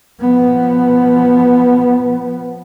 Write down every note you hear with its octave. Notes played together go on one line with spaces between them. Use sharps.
F3 B3